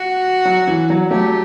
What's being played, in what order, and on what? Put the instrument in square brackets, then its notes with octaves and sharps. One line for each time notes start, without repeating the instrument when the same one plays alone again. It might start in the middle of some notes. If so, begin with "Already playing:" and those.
Already playing: [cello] F#4
[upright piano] F#3
E3
F#3
[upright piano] F#3 A3 [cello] G4